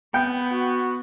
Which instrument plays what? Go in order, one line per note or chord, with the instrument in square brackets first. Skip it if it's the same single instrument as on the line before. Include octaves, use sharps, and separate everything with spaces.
[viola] B3 [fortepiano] G5
[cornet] F#4